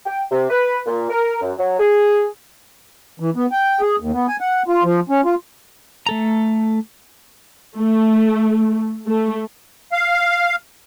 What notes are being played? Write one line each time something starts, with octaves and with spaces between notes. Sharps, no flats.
G5
C3
B4
A#2
A#4
F#2
F#3
G#4
E3
B3
G5
G#4
D#2
B3
G#5
F#5
F4
F3
C#4
F4
A3 A4 A#5
A3
A3
F5